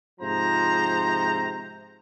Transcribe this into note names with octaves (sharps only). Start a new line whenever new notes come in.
G#2 C3 F3 C5 A#5